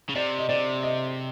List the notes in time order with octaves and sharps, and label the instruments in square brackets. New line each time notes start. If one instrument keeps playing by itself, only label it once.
[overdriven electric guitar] C#3
[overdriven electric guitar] C3 [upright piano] D5
[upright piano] D#5
[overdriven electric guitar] C3 [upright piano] D5
[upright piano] D#5